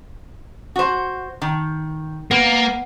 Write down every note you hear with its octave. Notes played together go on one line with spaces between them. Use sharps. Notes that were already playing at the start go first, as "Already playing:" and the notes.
F#4 C5
D#3
A#3 B3